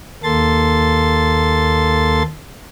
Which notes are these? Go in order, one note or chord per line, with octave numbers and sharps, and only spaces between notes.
D#2 A#3 A4 C6 A6